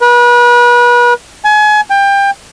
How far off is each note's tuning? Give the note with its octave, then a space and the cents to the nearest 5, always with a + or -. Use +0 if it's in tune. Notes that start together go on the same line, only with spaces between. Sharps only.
B4 -35
G#5 +30
G5 +25